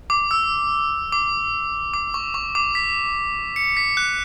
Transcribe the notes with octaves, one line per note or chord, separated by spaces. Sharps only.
D6
E6
D6
D6
C#6
C#6
D6
B6
C#7
B6
F#6